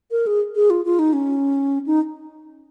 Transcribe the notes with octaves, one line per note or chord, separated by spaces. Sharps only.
A#4
G#4
G#4
F4
F4
D#4
C#4
D#4